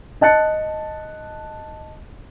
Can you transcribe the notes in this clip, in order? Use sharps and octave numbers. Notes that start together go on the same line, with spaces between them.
D#5 A5 F#6 A6 C#7